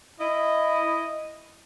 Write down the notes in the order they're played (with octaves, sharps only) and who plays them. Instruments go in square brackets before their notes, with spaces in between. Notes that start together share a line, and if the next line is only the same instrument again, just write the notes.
[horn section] E4 D#5